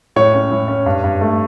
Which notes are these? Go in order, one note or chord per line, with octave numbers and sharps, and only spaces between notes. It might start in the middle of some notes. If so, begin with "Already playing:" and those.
A2 C#5
C#4
A2
C#4
G2
G2
A3